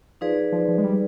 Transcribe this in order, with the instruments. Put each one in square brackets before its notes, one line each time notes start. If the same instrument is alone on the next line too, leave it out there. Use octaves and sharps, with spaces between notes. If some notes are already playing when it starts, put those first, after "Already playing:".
[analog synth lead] F3 [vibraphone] D#4 G#4 B4 D5
[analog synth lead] F3
F3
G#3
G3